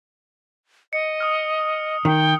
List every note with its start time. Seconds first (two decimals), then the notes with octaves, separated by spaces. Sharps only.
0.93 D#5 C#7
1.20 D#6 F6
2.05 D#3 G5